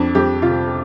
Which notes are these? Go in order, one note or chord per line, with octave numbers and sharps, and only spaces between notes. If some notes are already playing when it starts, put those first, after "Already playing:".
Already playing: F2 D4
F2 G4
C3 F4